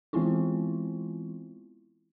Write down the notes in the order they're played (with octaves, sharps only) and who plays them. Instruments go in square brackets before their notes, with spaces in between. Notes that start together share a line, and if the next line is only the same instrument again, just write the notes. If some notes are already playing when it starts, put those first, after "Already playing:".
[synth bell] E3 G#3 B3 C4 E4 F4